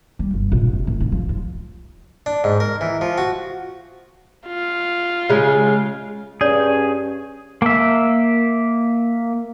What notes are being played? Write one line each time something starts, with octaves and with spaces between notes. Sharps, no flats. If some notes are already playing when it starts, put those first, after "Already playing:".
G3
G1
A#1
F#1
A1
D#3
F3
F3
D4
G#2
A#4
E3
F3
F#4
F4
C#3 G#3
G2 C#4 G#4 C#5 D5
A#3 E5